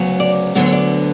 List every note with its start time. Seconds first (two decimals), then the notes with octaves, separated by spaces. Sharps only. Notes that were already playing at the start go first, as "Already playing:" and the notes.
Already playing: D2 C#3 F#3 B3
0.20 D5
0.55 D2 D3 F#3 B3 C#5
0.66 C#5
0.72 D5